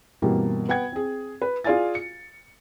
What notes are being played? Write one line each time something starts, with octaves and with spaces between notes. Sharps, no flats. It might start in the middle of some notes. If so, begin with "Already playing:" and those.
G2 B2 E3 G3 A#3 C4
B3 F#5 G5 G#6
C4 G#4
B4
F4 G#4 D5 F5 G#5 A6
C#7